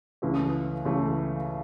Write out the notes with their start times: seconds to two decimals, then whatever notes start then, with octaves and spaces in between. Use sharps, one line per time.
0.22 C#2 C#3 E3 A3
0.85 C#2 C#3 E3 A3